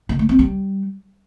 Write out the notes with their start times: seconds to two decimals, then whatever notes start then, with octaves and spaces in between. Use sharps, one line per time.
0.09 D3
0.19 A3
0.29 C4
0.39 G3